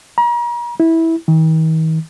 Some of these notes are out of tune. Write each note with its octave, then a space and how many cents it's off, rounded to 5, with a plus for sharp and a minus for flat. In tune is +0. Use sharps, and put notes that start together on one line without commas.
A#5 +40
E4 -15
D#3 +45